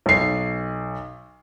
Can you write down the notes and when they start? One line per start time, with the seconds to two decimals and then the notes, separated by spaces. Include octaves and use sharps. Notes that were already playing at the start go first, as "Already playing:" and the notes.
0.06 B1 C7